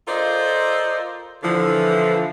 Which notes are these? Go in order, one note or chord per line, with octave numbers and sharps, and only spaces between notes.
F4 A4 A#4 C5 D5 D#5
D3 E3 F3